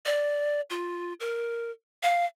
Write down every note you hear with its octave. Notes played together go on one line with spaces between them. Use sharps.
D5
F4
A#4
F5